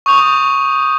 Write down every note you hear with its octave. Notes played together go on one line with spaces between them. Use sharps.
C#6 D#6 G6 F7